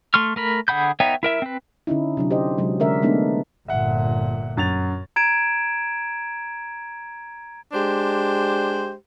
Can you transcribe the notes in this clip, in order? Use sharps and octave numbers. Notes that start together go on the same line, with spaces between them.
A3 C6 C#6 F6
A3 A#4 B5
D3 G#4 F#5 B5 G6
B3 D#4 C#5 E5 G5
E4 A#4 E5
C4 B4
D3 C#4 D#4 E4
C3 F#3 D4
G4 C5 D#5
C3 F#3 G#3
D3 G#3 C#4 A#4 D5 E5
G#3 A3 B3 D4 D#4
G1 A#2 E5 F#5
F#2 A6 F7
A#5 G#6 D7 E7
G#3 D4 G4 C5